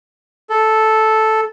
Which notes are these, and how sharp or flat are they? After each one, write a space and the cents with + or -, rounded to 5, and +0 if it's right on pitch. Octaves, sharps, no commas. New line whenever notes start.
A4 -5